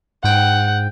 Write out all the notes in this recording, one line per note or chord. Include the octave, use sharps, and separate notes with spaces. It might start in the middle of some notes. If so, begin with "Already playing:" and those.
G#2 F#5 G5